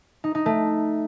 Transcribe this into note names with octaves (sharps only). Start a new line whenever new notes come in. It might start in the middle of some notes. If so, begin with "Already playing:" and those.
D#4
D#4
A3